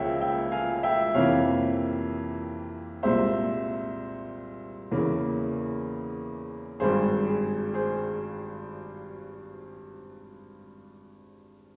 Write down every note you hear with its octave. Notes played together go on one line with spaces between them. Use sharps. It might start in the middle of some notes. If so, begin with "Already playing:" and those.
Already playing: C#2 C#3 F3 A#3 C#5 E5 G5
E5 G5
F5 G#5
E5 G5
F2 C3 E3 A#3 C#5 F5
C2 A#2 G#3 C5 E5
E2 C#3 E3 A#3
G#1 G2 G3 G#4 C5
G#4
G#4 C5